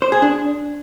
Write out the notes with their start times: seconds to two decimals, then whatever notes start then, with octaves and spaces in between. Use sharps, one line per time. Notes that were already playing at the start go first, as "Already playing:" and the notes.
0.02 C5
0.12 G#4
0.22 D4